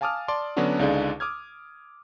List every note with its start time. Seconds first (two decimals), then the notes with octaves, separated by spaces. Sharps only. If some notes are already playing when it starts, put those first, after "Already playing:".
0.01 F5 G#5 A5 D6 D#6 F6
0.28 D5 A5 C6 D6
0.56 D3 F#3 B3 C#4 D4 F#4
0.79 C#2 D3 D#4 G#4 D5 F5
1.20 D6 D#6 F6 G#6